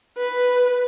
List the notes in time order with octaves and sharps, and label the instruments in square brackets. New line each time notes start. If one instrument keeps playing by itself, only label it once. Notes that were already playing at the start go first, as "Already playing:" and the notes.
[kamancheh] B4